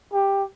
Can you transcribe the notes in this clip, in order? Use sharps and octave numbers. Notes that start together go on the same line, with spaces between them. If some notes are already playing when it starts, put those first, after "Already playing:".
G4